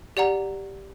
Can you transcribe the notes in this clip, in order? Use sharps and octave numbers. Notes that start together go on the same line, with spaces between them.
G4 D5 F#5 A#5